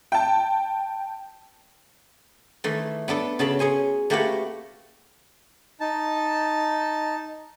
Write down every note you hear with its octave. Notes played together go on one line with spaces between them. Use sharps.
G5 A5
D#3 E3 A3
B3 D4 A4 B4
C#3 F#4 A4 A5 B5
C#4 G#4 G#5 C6
A3 A#3 F#4 G4 B4 F#5
D#4 A5